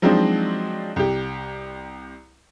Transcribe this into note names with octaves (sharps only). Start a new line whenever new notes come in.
F3 F#3 G#3 C4 D4 D#4
C2 G4